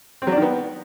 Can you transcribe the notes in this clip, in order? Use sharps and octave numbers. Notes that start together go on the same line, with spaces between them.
C4
F#3
D4
D#3
B3